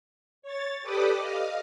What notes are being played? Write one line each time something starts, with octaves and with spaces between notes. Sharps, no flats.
C#5 A6
G4 A4 B4 D5 D6 D#6
D#5 F5